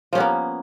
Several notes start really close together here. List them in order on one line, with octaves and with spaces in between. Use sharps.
F3 C#4 B3 A#3